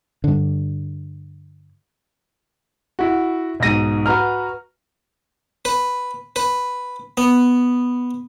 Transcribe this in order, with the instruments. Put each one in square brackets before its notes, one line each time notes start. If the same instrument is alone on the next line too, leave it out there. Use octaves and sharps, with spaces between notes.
[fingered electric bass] G2 D3
[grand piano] E4 F#4
B1 G#2 A#6 D#7
F#4 B4 A#5 F6
[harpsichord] B4
B4
B3